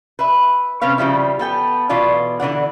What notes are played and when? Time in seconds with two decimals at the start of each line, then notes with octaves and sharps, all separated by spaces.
0.19 B4 E5
0.81 C3 C4 C#4 B4 F5
0.98 C#3 F3 G3 E4
1.39 B3 A4 G5
1.89 B2 E3 F4 D5
2.40 D3 E3 D5 F#5